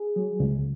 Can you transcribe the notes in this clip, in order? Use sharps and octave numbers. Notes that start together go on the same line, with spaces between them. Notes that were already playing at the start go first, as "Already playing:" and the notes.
Already playing: G#4
F#3
C#2